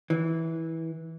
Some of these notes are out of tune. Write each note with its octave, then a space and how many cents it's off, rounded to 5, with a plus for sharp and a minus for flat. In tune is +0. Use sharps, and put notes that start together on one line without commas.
E3 -15